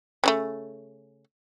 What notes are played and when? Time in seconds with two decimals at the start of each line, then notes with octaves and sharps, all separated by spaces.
0.24 C#3 G3 A3